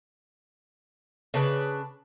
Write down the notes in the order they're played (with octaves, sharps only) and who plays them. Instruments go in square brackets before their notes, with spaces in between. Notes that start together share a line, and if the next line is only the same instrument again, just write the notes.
[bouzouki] C#3 D4 B4